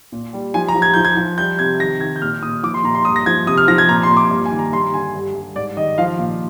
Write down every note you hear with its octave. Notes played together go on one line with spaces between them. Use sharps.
A#2
G3
F3 G#5
A#5
F3
G#6
F3 G6
G#6
F3
G3 G6
C3 G#6
D#3 A#6
D#3 G#6
G6
A#2 F6
A#2 D#6
F3 D6
C6
A#2 A#5
C6
G2 D#6
A#6
F3 G#6
C3 D#6
F6
F3 A#6
G#6
A#2 A#5
C6
A#2
D6
G2
G#5
D#3
A#5
G2 C6
D3 G#5
G2
G2
G#2 D5
D#3 D#5
F3 F5
A#2